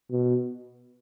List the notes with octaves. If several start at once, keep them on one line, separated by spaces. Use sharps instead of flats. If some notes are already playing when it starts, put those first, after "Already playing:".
B2